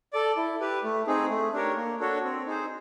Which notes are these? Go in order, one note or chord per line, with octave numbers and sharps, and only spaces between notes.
A4 D5
E4
G4 B4
A3
C4 D#4 G#4
A3
D4 G4 A#4 C#5
A#3
D4 F#4 A4 C#5
C4
D#4 G#4 C5